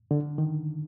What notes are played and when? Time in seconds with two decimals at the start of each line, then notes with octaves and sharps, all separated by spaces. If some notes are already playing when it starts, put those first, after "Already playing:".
0.11 D3
0.38 D#3